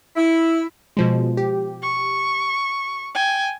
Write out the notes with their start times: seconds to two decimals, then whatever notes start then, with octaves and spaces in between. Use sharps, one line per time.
0.16 E4
0.97 B2 F3 G#3
1.37 G4
1.82 C#6
3.15 G5 G#5